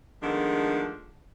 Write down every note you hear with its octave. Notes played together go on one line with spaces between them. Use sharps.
D#3 F3 G#3 A3 B3 D4